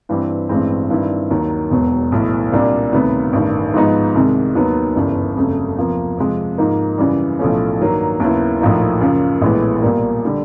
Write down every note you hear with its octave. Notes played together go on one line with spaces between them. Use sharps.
G2 E3 G3 C4
A1 G2 E3 G#3 C4
G2 D#3 G3 C4 E4
D#2 D#3 F#3
E1 E2 B2 F#3
B1 A2 E3
C2 A#2 G3 A#3 D4
D2 C3 D#3 F#3 B3
A1 G2 D#3
G#2 F3 G#3 B3 D#4
C2 C3 D#3 G#3
D#2 D#3 F#3 B3
G1 F#2 C#3 E3 G3
G1 F2 C#3 F#3 A3
E2 C3 F3 A#3
F2 C3 F3 G#3
G#2 F3 A#3 D#4
F#2 C#3 E3 G3
B1 A2 F3 A3 C#4
G2 D#3 F#3 A#3
D#2 C#3 F#3 B3 E4
A#1 A2 F3 A#3 D#4
F#2 C#3 F3 A#3
A#1 A2 E3 G#3 B3
B1 A#2 G3 A#3
D3 G3